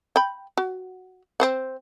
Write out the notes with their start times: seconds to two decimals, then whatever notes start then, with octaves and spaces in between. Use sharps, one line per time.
0.16 G5 B5
0.58 F#4
1.40 C4 C5 F#5